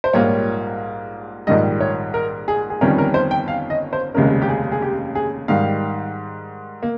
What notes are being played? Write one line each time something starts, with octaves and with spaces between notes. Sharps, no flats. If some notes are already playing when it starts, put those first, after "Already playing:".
C5
A#1 G#2 G3 A#3 F4 C#5
A#1 G#2 D#3 G3 D#5
C#5
A#4
G#4
G#4
G1 F2 D#3 G3 C#4 A#4
A#4
C5
G5
F5
D#5
C5
F1 D#2 C#3 G#3 C#4 A#4
G4
G#4
G#4
G4
G#4
G#2 D#3 G3 F5
A#3